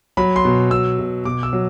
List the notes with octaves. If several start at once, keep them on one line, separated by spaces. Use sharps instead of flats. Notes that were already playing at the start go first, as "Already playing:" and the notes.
F#3 B5
C6
B2
B2 E6
B2
B2 D6
E6
F#3